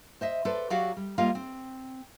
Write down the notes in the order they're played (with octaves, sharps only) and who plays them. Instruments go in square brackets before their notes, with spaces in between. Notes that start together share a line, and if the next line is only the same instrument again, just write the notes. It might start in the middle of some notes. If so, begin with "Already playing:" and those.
[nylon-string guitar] C5 D#5 E5
A4 B4 C5 D5
F#3 F#4 G4 D5 F5
G3
G3 A#3 F4 D#5 F5
C4